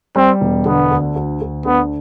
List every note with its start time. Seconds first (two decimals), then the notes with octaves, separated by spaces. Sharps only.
0.16 G3 C4
0.41 E1
0.66 D3 B3
0.91 D2
1.16 D2
1.42 D2
1.65 D3 B3